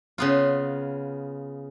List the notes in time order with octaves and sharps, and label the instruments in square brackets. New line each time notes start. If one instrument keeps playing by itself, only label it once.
[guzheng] C#3 B3 F4